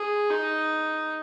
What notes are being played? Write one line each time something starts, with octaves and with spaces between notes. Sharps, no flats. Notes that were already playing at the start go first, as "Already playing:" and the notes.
Already playing: G#4
D#4